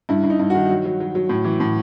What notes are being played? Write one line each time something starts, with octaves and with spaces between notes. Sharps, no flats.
G2 E4
G2
D#4
G2
D#3 F#4
F#3
F#3
F#3
F#3
A2
E3
A2